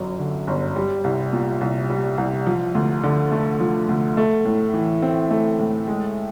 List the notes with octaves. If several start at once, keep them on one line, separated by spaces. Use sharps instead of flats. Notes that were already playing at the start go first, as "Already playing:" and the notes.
Already playing: G1 F#2 F#3
D3
G1
G3
C2
A#2
C2
G3
C2
F3
D2
D3
A3
F3
D2
A3
A2
E3
C4
A3
A2
G#3